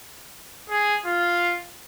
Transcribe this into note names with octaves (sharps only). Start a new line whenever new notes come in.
G#4
F4